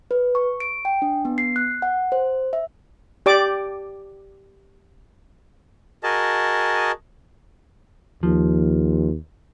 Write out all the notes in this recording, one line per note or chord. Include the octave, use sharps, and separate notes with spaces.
B4
C#6
D7
G5
D4
B3
C7
F#6
F#5
C5
E5
G4 D5 D6
F#4 G#4 A#4 D#5 A5
D#2 F3